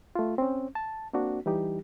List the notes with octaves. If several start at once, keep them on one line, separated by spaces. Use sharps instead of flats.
A3 F4
C4 C#4
A5
A#3 C4 D4 F#4
E3 G3 D#4 G4